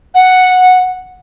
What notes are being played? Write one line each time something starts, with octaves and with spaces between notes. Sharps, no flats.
F#5